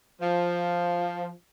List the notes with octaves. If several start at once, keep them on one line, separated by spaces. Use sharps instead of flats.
F3